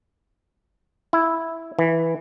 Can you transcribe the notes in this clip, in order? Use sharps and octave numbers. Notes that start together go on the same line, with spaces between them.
E4
E3